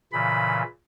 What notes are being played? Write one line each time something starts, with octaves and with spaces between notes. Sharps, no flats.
A#2 C#3 E3 B5